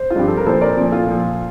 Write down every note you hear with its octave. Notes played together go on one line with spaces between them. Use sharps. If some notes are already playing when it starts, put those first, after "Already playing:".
Already playing: C5
F4
G2 F3 G4
A4
A#4
A#2 F3 A4 C5
A#4 D5
A#2 F3
F4 A4
A#2 F3